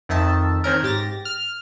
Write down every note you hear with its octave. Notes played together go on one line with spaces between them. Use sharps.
F2 D#3 D#5 E5 A5
D#3 C4 C#4 A#4
G#2 G4 A6 A#6
F6